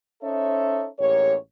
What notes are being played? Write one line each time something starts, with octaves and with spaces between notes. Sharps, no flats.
C#4 D#4 A4 C5 C#5 E5
A1 G#2 A#3 G4 C#5